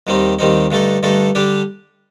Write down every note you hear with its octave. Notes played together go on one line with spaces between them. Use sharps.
D#2 D#3 G3 C4 D#4
D#2 D#3 G3 C4 D#4
G2 D3 A3 D#4 A4
G2 D3 A3 D#4 A4
D3 G3 D4 G4